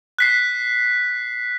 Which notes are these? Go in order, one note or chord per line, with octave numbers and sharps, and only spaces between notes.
F#6 B6 C7